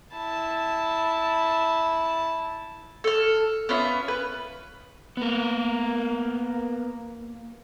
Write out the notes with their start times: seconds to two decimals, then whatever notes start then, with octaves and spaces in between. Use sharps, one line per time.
0.15 E4 A5
3.04 A4 F6
3.69 B3 C#4 F4 E5
4.08 B4
5.17 A#3 B3 A#4